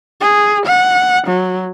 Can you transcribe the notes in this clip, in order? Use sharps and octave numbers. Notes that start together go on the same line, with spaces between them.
G#4
F#5
F#3